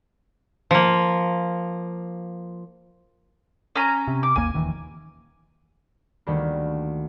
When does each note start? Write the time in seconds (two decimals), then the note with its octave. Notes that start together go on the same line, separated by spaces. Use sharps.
0.71 F3 A#3
3.76 C#4 G#5 A#5
4.08 C3
4.23 D6
4.36 G#1 D#2 A#3 G#5
4.54 D#1 D#3 E3
6.27 D2 D#3 G3 A#3